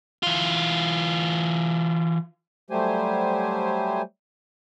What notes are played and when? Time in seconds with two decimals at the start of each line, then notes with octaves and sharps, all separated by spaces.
0.23 E3 F4
2.70 F#3 G3 A3 G4 C5 G#5